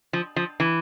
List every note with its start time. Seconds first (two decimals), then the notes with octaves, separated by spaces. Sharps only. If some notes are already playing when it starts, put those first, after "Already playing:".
0.13 F3
0.36 F3
0.60 E3